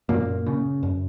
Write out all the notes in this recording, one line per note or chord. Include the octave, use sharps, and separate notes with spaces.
F#2 A#2 A#3
C#3
F#2